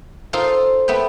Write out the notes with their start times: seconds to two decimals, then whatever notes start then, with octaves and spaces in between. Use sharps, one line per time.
0.33 D#4 F4 A4 C5
0.88 A3 B3 E5 G5